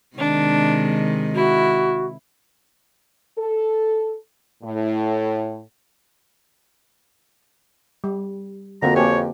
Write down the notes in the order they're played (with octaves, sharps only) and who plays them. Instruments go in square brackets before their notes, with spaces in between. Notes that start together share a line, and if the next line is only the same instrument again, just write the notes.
[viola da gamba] C3 D#3 G#3 [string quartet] D4
[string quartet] E4 [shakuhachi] F#4
[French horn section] A4
A2
[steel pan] G3
[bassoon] F2 [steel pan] D3 A#3 C4 [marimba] F#4 A#4 F#5 [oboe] A#5
[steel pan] A#3 G4 [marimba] B4 G#5 A5 [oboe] C#5